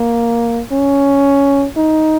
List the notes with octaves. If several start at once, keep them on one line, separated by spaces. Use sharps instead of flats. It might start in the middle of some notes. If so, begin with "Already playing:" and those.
Already playing: A#3
C#4
D#4